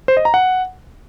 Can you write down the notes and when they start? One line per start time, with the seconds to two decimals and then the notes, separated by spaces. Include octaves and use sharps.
0.08 C5
0.17 D#5
0.25 A#5
0.34 F#5